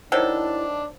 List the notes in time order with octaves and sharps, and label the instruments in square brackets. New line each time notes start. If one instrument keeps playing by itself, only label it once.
[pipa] D#3 F#3 A4 [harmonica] D4 [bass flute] E4 [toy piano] C5 C#5 D#5